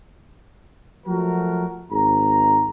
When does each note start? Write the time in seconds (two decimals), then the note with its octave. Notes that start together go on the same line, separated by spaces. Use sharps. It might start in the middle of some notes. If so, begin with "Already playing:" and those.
1.06 F3 F#3 A3 F#4 A#4
1.91 G#1 G#2 A#5